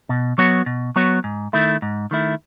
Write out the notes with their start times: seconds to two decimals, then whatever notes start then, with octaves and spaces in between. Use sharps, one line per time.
0.09 B2
0.38 F#3 B3 F#4 C#5
0.66 B2
0.96 F#3 B3 F#4 C#5
1.24 G#2
1.53 D#3 A3 E4
1.82 G#2
2.11 D#3 A3 E4